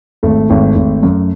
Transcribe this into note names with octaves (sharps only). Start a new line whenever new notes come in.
G#1 A3
G#1
G#1
F#2